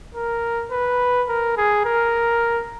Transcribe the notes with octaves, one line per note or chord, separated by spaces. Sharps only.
A#4
B4
A#4
G#4
A#4